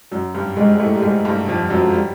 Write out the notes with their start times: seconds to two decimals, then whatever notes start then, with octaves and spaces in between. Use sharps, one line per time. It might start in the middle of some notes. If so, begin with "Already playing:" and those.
0.11 F#2 F#3
0.34 G2 G3
0.57 G#2 G#3
0.74 G#3
0.80 A2 A3
0.95 G3
1.02 G#2 G#3
1.25 G2 G3
1.48 F2 F3
1.70 F#2 F#3
1.94 G3